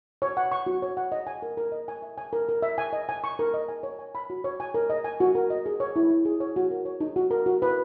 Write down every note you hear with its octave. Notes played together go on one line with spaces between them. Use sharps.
C#5
F#5
C#6
F#4
C#5
F#5
D#5
G#5
A#4
A#4
D#5
G#5
E5
G#5
A#4
A#4
E5
G#5
D#5
G#5
C#6
A#4
D#5
G#5
C#5
G#5
B5
F#4
C#5
G#5
A#4
D#5
G#5
F#4
A#4
D#5
G#4
C#5
E4
E4
G#4
C#5
F#4
A#4
C#5
D#4
F#4
A#4
F#4
B4